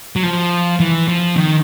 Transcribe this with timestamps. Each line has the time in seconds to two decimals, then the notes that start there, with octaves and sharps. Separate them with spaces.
0.16 F#3
0.23 F3
0.80 E3
1.08 F3
1.37 D#3